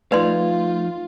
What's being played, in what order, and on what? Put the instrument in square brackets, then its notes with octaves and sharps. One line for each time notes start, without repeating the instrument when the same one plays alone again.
[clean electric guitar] F3 D#4 F5 [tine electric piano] A3 [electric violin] F4 [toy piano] B4 D5 C6